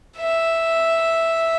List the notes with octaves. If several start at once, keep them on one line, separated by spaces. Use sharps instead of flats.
E5